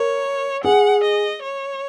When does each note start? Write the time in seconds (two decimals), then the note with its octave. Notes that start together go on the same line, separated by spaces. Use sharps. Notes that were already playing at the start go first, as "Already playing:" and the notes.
Already playing: A#4 C#5
0.64 G#4 F#5
1.03 D#5
1.42 C#5